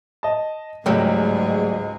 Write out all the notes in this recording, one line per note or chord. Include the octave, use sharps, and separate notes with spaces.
D#5 A5
C#2 G#2 F#3 G3 A3 G#4 G5